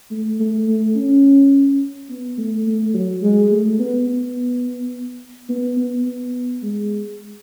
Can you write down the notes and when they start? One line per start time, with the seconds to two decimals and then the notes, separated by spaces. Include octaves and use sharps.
0.11 A3
0.40 A3
0.68 A3
0.96 C#4
2.10 B3
2.38 A3
2.66 A3
2.94 F#3
3.22 G#3
3.51 A3
3.79 B3
4.07 B3
5.49 B3
5.77 B3
6.06 B3
6.63 G#3